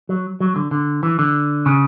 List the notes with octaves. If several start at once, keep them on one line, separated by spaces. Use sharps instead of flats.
F#3
F#3
D3
D3
E3
D3
C#3